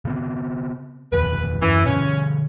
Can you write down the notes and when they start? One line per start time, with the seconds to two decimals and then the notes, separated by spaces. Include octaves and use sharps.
0.05 C#3 B3 C4
1.13 F1 D#2 B4
1.62 F#2 E3 C#4
1.86 B2 D3 C#4